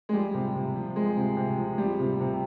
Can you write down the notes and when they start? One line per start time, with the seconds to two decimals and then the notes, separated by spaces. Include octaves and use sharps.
0.09 G#3
0.13 F3 G3
0.34 C3
0.55 C3
0.76 F3
0.96 F3 G#3
1.17 C3
1.37 C3
1.58 F3
1.78 F3 G3
2.00 C3
2.20 C3